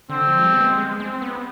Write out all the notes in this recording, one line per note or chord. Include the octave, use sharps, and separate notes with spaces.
D3 C4
F3
G#3
G3
B3
G#3
G#3
C4
B3